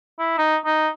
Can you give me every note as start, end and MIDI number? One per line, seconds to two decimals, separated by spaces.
0.19 0.34 64
0.38 0.57 63
0.65 0.89 63